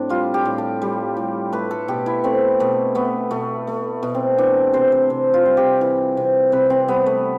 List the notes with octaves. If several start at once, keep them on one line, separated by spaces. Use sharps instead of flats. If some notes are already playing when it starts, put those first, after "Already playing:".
Already playing: A2 C4 D4
G3 F4
G4
A2
A4
G3
A2
A3 B4
A4
B2 G4
E4
A3 C4
B2 A3
A3 B3
B2 A3
A3
B2
C4
E3 D4
C3 C5
C5
C3
F4
G3
G4
E3
C3
C3 B4
C4
G3 B3
A3